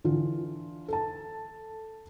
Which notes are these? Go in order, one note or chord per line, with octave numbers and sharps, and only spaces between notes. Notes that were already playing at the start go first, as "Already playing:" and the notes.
D3 E3 F4
A4 A5